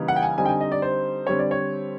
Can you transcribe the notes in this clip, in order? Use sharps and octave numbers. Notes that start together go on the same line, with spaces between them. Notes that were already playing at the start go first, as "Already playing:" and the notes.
Already playing: C#3 E3 G3 A#3 D#4
F#5
G5
G#5
D3 G3 C4 D#4 G#5
G5
G#5
D#5
D5
C5
D3 G3 C4 C#5
D5
C#5